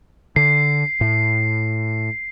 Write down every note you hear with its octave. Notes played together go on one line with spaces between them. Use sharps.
D3 C7
A2